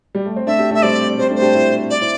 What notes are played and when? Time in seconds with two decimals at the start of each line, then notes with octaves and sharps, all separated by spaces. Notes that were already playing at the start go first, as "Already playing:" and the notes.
0.15 G3
0.26 A3
0.36 C4
0.47 A3 D4 E5
0.59 D4 G4
0.71 A3 D4
0.74 E5
0.83 G3 C4 D5
1.18 G3 C4 C5
1.30 A3 D4
1.36 C5
1.42 D4 G4
1.55 C4 E4
1.90 D5
2.01 C4 E4